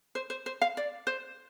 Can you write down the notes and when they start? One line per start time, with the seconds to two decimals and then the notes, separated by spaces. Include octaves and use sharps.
0.15 C5
0.30 C5
0.46 C5
0.61 F5
0.77 D5
1.07 C5